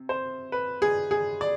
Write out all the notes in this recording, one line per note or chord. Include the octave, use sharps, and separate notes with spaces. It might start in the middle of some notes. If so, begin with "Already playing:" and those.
Already playing: C3
C5
B4
G#4
G#4
D5